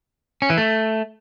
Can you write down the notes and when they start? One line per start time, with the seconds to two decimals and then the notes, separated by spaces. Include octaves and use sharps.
0.42 C#4
0.50 E3
0.58 A3